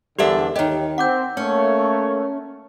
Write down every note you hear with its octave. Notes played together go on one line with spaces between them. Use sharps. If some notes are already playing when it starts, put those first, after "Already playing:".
E2 D3 G3 D4 G4 A4 A#4 E5
D#2 D#3 G4 C#5 D#5
C4 F#5 D6 G6
A3 A#3 C#4 C#5